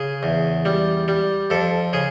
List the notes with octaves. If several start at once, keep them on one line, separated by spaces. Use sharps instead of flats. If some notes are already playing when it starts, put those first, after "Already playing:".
Already playing: C#3 G#4
E2
G3
G3
F2 A4
C#3 G#4